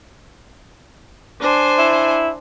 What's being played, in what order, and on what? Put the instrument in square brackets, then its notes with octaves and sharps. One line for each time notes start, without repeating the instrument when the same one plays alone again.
[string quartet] D4 C5 G#5
[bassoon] E4